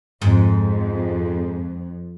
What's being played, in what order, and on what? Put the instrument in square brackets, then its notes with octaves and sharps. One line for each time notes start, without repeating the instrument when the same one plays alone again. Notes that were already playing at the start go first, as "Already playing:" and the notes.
[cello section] F2 [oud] G#2